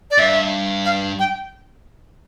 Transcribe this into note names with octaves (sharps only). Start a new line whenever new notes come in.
D5
G2 E5
F5
G5